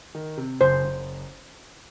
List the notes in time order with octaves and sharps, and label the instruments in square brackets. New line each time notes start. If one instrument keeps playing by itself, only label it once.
[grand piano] D#3
C3
[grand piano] F#1 [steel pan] C5
[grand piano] F#1